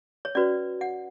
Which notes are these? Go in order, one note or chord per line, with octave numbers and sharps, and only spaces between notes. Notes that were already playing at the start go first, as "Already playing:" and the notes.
C#5
C#4 F#4 B4 D5
F#5